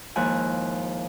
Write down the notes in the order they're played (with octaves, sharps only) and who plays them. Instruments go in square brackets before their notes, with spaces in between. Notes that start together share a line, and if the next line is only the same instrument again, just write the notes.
[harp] D#2 G#2 F3 E4 G#5 F#6